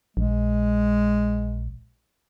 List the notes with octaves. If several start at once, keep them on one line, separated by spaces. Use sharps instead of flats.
A#1 G#3